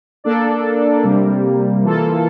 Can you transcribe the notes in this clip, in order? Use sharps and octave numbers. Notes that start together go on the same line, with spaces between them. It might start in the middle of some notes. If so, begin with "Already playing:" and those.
A#3 D4 A4 D5
C3 G3 A#3
E3 A#3 F4 A4